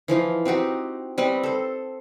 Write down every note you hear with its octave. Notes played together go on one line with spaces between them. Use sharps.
E3 F3 D#4 F4
C4 D#4 F#4 G4
G3 C4 B4 D#5
A4 C5